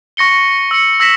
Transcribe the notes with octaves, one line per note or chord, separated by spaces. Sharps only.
C#6 A#6 C#7 G7
E6 C#7
E6 A#6 B6 E7